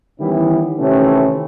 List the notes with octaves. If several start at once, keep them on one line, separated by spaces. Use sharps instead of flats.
D#3 E3 G3 B3 C#4 E4
C3 D#3 E3 A3 C4 C#4